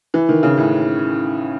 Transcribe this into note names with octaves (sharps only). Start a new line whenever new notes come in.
E3
D#3
C#3
A2